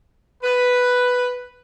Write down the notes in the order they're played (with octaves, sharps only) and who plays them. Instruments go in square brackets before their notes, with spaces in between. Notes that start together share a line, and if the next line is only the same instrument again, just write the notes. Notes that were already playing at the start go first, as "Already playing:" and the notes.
[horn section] B4